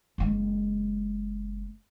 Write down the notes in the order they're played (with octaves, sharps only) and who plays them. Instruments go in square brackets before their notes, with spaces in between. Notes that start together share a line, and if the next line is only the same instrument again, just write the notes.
[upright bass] F#1 G#3